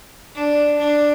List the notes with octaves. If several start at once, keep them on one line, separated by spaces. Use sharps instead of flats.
D4
D4